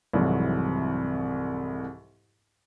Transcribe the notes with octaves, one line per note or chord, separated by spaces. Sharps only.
C2 F2 G#2 C3 E3 F#3